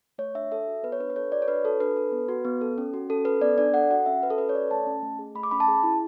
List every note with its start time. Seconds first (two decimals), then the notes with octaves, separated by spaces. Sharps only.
0.18 A3 C#5
0.35 D4 E5
0.52 A4 E5
0.67 F#4
0.83 B3 B4
0.92 C#5
1.00 D4 B4
1.10 B4
1.16 A4 C#5
1.32 F#4 D5
1.42 C#5
1.48 D4 B4
1.64 F#4 A4
1.80 D4 B4
1.97 A4
2.12 B3
2.29 F#4
2.45 B3
2.61 A4
2.78 C#4
2.94 F#4
3.09 C#4 A4
3.25 A4 B4
3.41 B3 D5
3.58 D4 D5
3.74 A4 F#5
3.90 F#4 F#5
4.06 C#4 E5
4.23 F#4 B4
4.30 A4
4.38 C#4 B4
4.49 C#5
4.54 A4 D5
4.71 A3 A5
4.87 C#4
5.03 A3
5.19 G#4
5.35 A3 B5
5.43 D6
5.51 C#4 B5
5.60 A5
5.68 G#4
5.83 E4